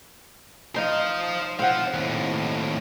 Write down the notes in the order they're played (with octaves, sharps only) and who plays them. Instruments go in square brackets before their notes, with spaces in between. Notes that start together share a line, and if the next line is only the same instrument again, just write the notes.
[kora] D#4 [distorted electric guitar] C5 F5
[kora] C4 F#5 [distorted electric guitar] C5 F5
[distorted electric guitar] D#2 A2